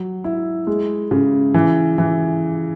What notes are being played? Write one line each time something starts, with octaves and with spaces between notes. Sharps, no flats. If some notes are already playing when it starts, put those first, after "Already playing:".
Already playing: F#3
E4
G#3
C#3
E3
E3